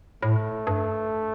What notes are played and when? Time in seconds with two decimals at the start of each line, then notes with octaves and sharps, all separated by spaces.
0.23 A2 A3
0.67 G2